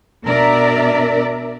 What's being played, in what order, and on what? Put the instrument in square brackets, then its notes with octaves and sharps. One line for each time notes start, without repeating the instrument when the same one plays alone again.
[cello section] B2 D4 A#4 D5 E5